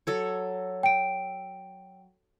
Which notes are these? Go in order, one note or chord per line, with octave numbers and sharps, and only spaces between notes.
F#3 A4 C#5
G5 D7